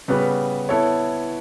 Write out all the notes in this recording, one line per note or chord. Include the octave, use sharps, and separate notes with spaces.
C#3 G3 B3 F#4 B4
B3 E4 A4 C#5